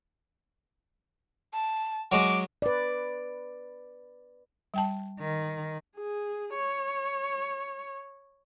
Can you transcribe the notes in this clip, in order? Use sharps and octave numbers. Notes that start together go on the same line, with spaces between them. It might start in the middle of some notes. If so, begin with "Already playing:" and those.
A5
F#3 G#3 D6
B4 D5
G3 G5 A5
D#3
G#4
C#5